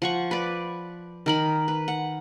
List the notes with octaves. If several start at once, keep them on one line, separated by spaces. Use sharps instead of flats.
F3 F#5 C#6
B4 D5
D#3 A#4 B5
B4
F#5